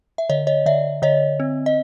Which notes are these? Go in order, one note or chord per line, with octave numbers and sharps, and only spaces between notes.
E5
D3 C#5 D#5
C#5 D#5
D3 D5 E5
D3 C#5 D#5
C4
D#5